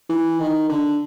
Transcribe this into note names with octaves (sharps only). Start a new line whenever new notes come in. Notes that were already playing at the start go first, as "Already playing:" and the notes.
E3
D#3
D3